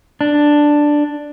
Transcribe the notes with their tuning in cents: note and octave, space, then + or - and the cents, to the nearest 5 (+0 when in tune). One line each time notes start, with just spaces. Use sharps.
D4 +5